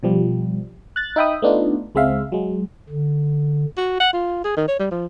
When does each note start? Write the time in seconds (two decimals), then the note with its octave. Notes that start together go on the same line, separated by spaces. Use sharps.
0.03 B2 F3 G3
0.96 F#6 A6
1.16 D#4 E5 G5 B5 D#6
1.42 A3 B3 D4 D#4 F4
1.95 C#2 G#3 C4 E5 F5
2.32 F#3 G#3
2.90 D3
3.77 F#4
4.00 F#5
4.13 F4
4.44 G#4
4.57 D#3
4.68 C#5
4.79 G3
4.91 F3